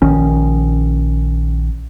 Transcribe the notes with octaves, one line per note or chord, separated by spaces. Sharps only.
A#1 D#3 C#4